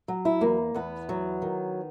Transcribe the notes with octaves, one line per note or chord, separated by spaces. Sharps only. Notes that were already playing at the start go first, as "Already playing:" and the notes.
F#3
E4
E2 A#3
E2 B3
F#3
D#3